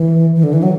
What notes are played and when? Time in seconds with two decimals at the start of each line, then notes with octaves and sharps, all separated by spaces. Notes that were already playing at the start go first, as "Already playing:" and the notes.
Already playing: E3
0.36 E3
0.43 D3
0.53 E3
0.63 F#3